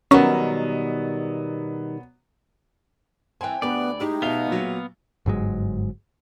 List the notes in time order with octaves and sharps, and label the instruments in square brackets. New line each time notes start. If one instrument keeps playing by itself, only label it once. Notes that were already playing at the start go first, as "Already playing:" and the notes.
[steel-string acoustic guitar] B2 D#3 G3 [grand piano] F#3 B3 [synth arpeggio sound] C#4
[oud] E3 C4 [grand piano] G5 G#5
[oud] D2 G4 B4 [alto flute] B3 [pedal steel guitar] D5
[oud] G#3 E4 G4 [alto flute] D#4
[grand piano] B2 E5 G7 [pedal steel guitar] B3 F5
[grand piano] A#2 F#3
[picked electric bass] G1 G#2 F#3 G#3